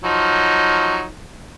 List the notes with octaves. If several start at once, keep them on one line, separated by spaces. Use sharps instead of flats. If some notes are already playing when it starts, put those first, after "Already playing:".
F3 F#3 D#4